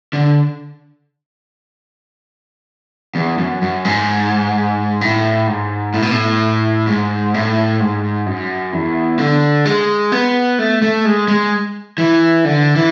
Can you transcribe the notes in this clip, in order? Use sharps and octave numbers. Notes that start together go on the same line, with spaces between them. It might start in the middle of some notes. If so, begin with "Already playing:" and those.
D3
E2
F#2
F#2
G#2
A2
G#2
A2
B2
A2
G#2
A2
G#2
F#2
E2
D3
G#3
B3
A3
A3
G#3
G#3
E3
D3
E3